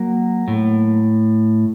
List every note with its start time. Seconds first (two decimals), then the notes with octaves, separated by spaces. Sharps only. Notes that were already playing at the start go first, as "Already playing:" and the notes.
Already playing: F#3 A#3
0.48 A2